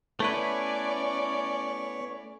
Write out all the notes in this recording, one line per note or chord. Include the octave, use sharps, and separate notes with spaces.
A3 B3 C#4 E4 B4 C#5 D5